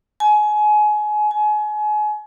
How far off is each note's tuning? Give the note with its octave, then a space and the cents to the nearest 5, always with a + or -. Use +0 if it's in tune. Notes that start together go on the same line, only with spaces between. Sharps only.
G#5 +25
G#5 +30